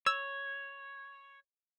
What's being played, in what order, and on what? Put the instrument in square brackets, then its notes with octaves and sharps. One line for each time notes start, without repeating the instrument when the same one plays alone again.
[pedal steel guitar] C#5 [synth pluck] E6